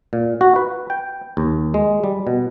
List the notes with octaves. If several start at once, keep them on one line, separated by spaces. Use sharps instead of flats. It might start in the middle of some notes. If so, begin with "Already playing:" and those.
A#2
F#4
B4
G5
D#2
G#3
G3
B2